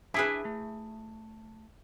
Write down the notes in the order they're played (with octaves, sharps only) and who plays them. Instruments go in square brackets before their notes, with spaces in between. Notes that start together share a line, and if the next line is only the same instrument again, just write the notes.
[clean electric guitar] D4 E5 G#5 [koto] E4 G#4 B4
[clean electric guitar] A3